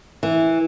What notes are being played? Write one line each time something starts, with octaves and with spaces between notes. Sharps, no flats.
E3